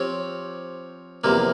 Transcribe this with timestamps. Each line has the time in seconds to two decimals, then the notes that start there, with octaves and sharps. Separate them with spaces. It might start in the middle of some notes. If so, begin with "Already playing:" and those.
Already playing: F3 C4 G4 C#5
1.24 E2 C3 F3 A#3